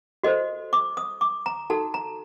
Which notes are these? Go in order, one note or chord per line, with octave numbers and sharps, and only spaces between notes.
F#4 A4 C5 D#5
D6
D#6
D6
A#5
D#4 F#4 A4 A5
A#5